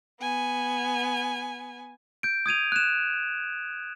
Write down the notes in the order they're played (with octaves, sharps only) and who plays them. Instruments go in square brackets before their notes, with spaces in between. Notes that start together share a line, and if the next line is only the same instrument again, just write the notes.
[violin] B3 G#5
[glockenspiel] G6 D7
D#6 G#6 D#7 F7
F#6 E7